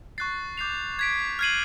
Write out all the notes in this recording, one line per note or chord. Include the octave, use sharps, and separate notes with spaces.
C#6 F#6 A6 C7
D6 G6 C7 F7
G#6 B6 D7
F6 G#6 C7 D#7 F#7